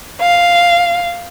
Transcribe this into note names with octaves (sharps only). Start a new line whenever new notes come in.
F5